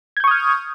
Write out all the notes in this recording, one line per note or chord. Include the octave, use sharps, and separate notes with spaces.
C#6 D#6 F6 G6 G#6